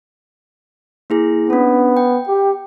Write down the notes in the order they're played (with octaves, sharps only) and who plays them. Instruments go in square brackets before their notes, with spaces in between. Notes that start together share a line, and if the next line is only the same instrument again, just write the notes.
[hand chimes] A#3 E4 G#4
[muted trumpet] B3 [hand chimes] C#4 D4
[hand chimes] G5
[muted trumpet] G4